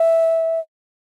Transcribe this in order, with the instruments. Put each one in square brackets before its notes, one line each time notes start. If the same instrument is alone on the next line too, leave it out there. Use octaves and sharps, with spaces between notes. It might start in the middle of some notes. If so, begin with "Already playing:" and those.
Already playing: [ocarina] E5